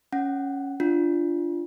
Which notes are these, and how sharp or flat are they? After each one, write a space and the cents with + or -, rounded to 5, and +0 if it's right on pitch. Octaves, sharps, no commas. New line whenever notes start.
C#4 +0 F#5 +0
D4 +0 F4 -15